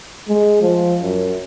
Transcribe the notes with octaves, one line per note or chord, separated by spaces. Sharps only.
G#3
F3
F#2